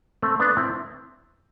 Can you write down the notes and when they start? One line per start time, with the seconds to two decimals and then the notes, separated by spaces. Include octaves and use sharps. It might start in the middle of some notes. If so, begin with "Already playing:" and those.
0.22 A3 C4
0.40 B3 D4
0.57 C4 E4